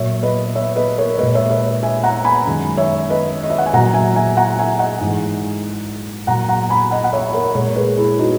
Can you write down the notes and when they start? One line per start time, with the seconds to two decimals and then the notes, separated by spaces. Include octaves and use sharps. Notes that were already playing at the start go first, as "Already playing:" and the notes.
Already playing: A#2 F#3 C#5 E5
0.23 B4 D#5
0.55 C#5 E5
0.76 B4 D#5
0.98 A#4 C#5
1.18 A#2 G#3 B4 D#5
1.35 C#5 E5
1.51 C#5 E5
1.83 E5 G#5
2.03 F#5 A#5
2.24 G#5 B5
2.46 F#2 D#3 G#3
2.77 C#5 E5
3.10 B4 D#5
3.43 D#5
3.50 E5
3.58 F#5
3.66 G#5
3.73 A#2 F#3 F#5 A#5
3.94 E5 G#5
4.15 E5 G#5
4.37 F#5 A#5
4.58 E5 G#5
4.79 D#5 F#5
5.01 G#2 E3 G#3
6.27 A#2 F#3 F#5 A#5
6.49 F#5 A#5
6.70 G#5 B5
6.91 D#5 F#5
7.04 F#5
7.13 C#5 E5
7.33 A#4 C#5
7.54 A#2 G#3 A#4 C#5
7.76 G#4 B4
7.97 E4 G#4
8.18 D#4 F#4